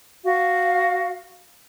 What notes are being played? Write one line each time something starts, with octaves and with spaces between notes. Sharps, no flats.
F#4 F5